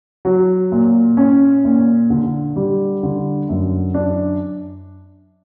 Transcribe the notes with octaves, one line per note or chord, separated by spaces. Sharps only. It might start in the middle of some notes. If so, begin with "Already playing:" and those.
F#3
A#2
C#4
A#2
D3
G3
D3
F#2
D4